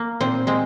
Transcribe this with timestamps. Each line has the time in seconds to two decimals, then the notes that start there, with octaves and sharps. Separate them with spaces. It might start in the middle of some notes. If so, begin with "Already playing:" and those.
Already playing: A#3
0.21 A#2 C4
0.47 G#3 C4